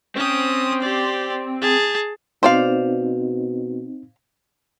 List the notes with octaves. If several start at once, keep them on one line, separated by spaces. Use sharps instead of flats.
C4 C#4 D#6
G4 D5
G#4 A5
B2 C4 D#4 C5 D5 F5